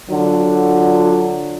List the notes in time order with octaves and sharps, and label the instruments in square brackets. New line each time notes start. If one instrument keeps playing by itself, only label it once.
[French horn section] D3 F#3 F4